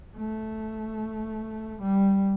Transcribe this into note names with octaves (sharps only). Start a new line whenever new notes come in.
A3
G3